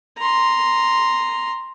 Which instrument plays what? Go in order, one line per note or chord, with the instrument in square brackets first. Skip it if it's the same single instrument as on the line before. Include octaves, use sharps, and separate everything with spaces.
[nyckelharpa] A#5 C6